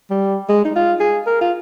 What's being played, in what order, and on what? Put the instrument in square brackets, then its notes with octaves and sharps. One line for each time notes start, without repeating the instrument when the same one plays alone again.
[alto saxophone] G3
G#3
D#4
F4
G#4
A#4
F4